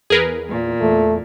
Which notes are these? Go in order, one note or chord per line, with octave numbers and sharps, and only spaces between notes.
E2 G#4 A#4 B4
A#2
E2 A3